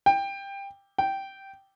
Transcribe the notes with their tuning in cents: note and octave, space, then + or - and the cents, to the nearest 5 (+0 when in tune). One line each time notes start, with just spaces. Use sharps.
G5 +15
G5 -10